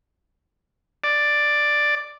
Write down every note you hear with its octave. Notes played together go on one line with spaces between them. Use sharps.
D5